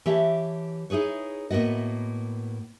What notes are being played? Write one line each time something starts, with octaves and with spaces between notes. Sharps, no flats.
E3 G4 C#5 E5 A5
D#4 E4 G#4 B4 C#5
A2 A#3 B3 F#4 D#5